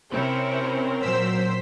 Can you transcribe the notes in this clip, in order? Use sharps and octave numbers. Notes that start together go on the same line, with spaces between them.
C3 C4 C#4 E4 A#4
A#2 F#3 C5 E6 B6